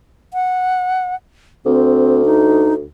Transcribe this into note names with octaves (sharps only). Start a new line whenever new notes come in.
F#5
D2 C4
D#4